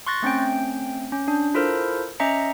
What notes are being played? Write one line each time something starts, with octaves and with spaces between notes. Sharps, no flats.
C6 C#6 F#6 A6 A#6
A3 C4 C#4 G5
C#4
D4
E4 F4 A4 A#4 C5
C#4 D#5 E5 A#5 C#7